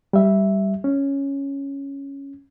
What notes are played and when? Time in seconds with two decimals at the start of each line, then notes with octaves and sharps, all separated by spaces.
0.13 G3 E5
0.84 C#4